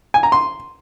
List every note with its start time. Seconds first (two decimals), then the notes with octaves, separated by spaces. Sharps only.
0.14 G#5
0.23 A#5
0.32 C6